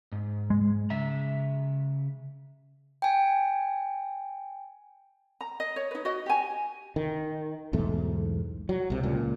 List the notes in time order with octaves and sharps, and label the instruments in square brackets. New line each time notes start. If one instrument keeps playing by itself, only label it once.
[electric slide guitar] G#2
[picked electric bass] G#3
[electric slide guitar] C#3 E5 A#5
[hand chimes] G5 G#5
[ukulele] A#5
D#5
C#5
D#4 B4
F#4 D#5
G4 G#5
[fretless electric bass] D#3
B1 E2 G#2 A3
F#3
C2 C3
C#2 A#2